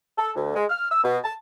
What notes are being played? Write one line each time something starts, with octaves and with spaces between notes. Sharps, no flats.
A4
D2
G#3
F6
E6
B2
A5